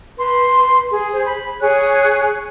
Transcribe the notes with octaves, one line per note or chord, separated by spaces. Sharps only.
B4 C6
G#4
G#4 C5
B5
G#4 C#5 G#5 F#6